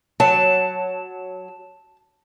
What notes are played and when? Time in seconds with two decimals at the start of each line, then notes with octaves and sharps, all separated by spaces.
0.20 F#3 A5